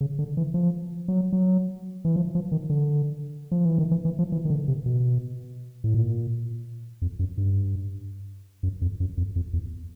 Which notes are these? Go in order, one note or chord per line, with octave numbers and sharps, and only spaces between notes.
C#3
D3
E3
F3
F#3
F#3
E3
F3
F3
D#3
D3
F3
E3
D#3
E3
E3
F3
E3
D#3
D3
C3
B2
A2
A#2
F2
F#2
G2
F#2
F2
F#2
F2
F2
E2